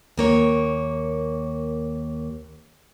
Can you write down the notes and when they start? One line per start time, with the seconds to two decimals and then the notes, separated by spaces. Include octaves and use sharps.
0.17 D#2 A#3 C#5